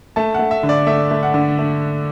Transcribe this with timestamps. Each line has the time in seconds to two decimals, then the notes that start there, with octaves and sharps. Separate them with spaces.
0.16 A3 A5
0.34 A3 F#5
0.51 E5
0.63 D3
0.69 D5
0.87 A3 E5
1.11 A3
1.23 F#5
1.34 D3
1.58 A3